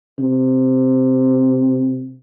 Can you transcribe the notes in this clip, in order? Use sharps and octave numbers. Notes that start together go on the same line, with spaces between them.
C3